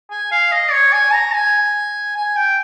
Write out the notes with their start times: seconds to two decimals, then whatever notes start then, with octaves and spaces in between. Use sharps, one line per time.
0.11 G#5
0.31 F5
0.52 D#5
0.72 C#5
0.93 G#5
1.14 A#5
1.34 G#5
2.16 G#5
2.37 G5